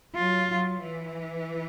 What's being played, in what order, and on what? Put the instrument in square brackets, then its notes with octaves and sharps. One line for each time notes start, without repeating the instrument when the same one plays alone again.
[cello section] F#3 [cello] F4
[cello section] F#3
E3